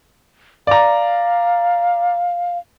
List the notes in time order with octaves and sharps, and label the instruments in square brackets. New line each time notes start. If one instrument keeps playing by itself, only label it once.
[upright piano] D5 A#5 [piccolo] F5